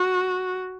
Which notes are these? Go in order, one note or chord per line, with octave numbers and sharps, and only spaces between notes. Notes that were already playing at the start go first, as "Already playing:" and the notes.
Already playing: F#4